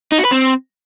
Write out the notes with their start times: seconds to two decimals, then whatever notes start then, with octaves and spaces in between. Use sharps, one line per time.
0.12 D#4
0.18 F#4
0.25 B4
0.31 C4